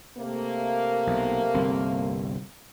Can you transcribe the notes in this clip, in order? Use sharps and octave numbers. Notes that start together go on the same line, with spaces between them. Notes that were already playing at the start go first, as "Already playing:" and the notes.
C3 A3 A#3
B1
G1 C2 C4